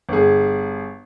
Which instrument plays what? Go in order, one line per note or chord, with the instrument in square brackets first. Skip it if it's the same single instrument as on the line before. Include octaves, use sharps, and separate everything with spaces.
[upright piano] G1 G#4